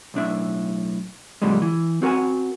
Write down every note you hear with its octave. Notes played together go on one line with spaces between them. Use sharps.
B1 A2 D4 E5
F#2 A#2 D3 G3 G#3
E3
C4 F#4 A#4 F#5 G#5